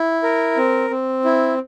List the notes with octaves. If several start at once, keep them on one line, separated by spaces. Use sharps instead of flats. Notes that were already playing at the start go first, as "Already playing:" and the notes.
Already playing: E4
A#4
C4
C4
E4